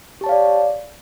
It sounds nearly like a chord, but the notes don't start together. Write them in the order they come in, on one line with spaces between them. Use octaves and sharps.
G4 A5 C#5 F5 D5